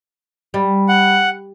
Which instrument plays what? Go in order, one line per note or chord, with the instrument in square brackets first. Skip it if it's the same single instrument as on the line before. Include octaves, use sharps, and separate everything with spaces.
[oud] G3
[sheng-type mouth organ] F#5